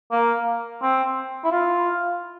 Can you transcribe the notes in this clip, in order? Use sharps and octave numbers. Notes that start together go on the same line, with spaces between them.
A#3
C4
E4
F4